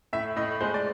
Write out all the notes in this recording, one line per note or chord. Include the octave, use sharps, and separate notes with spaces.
A2 E5
A2 D#5
G#3 C5
D5